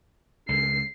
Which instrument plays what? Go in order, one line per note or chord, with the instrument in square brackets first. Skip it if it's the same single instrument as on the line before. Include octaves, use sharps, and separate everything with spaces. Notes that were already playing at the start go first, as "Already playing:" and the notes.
[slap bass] C#2 [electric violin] C7